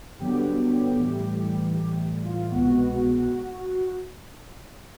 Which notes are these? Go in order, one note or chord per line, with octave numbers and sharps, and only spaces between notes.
G2 D3 F#3 B3 G4
A2 E3 G3
A2 E3 G3 G4
F4
C2 B2 G#3 B3 F#4